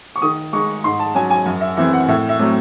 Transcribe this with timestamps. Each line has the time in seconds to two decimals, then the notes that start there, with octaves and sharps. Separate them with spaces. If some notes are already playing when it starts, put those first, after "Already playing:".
0.16 C#6
0.22 D#3 D#6
0.53 G#3 D#4 C#6
0.84 G#2 C6
1.00 A5
1.15 F#3 C#4 G#5
1.30 G#5
1.46 F#2
1.61 E5
1.77 E3 C4 E5
1.93 F#5
2.08 A2 E5
2.29 E5
2.39 F#3 A3 C4